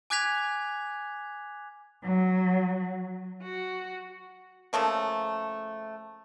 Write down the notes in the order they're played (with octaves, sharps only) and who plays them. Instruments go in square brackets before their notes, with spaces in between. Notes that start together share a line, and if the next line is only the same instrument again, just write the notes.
[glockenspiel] G#5 D6 F#6 G#6 B6 F7
[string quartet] F#3
F#4
[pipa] C#3 F3 A3 A#3